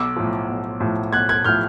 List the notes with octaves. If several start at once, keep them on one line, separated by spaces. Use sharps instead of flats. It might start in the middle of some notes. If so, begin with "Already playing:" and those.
Already playing: B1 D6 E6
A2 F3
B1
A2 F3
B1 F#6 G#6
F#6 G#6
A2 F3 F6 G6